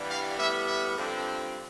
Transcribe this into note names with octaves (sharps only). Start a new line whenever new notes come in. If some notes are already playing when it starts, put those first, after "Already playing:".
Already playing: G2 E3 G3 B3
F5
A2 G3 B3 E5
E5
G2 D3 F3 C4
G5